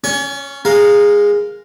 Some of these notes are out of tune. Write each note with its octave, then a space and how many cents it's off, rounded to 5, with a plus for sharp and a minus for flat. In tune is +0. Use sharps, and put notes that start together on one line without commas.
C#4 +0 C#5 +45 C#6 +0
G#3 -15 A#4 +0 F5 +0